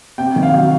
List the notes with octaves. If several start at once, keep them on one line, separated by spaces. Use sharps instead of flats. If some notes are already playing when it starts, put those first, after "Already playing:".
C3 G5
D#3
F5
F#3